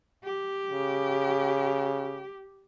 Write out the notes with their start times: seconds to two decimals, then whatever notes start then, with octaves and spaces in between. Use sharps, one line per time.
0.24 G4
0.71 C#3